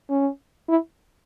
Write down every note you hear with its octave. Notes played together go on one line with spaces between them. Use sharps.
C#4
E4